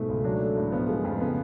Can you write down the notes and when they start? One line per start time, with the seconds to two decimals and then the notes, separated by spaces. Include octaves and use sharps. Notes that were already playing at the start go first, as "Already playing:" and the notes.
Already playing: G#2 B2 A3
0.09 C#2
0.24 F#3 D4
0.41 A3
0.57 A2
0.72 F3 B3
0.89 G#3
1.04 F2
1.20 C#3 B3